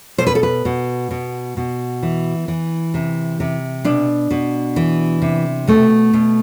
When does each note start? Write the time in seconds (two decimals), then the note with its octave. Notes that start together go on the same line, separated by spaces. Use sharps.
0.18 B2 C5
0.27 B4
0.35 A4
0.43 B4
0.65 B2
1.11 B2
1.57 B2
2.03 E3
2.48 E3
2.94 C3
3.40 C3
3.84 B2 D4
4.31 B2
4.76 E3
5.22 C3
5.67 B2 A3
6.13 B2